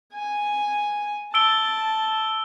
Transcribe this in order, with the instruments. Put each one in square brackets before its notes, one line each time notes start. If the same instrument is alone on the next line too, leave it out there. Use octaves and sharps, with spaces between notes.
[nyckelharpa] G#5
[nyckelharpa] A5 [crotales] E6 D7 G7